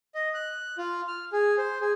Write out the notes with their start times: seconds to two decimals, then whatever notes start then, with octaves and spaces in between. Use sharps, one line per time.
0.15 D#5
0.34 F#6
0.78 F4
1.08 F6
1.32 G#4
1.58 C5
1.81 G#4